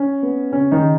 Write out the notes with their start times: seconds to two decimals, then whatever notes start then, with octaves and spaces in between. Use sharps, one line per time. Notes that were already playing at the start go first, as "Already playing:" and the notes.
Already playing: C#4
0.23 B3
0.52 C#3 C#4
0.71 D#3 D#4
0.82 C#3